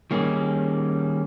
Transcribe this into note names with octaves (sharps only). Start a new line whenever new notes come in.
D#3 G3 A#3 C#4 G#4